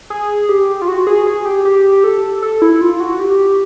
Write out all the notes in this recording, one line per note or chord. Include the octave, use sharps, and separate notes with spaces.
G#4
G4
F4
F#4
G#4
G#4
G4
G4
A4
A4
E4
F4
F#4
G4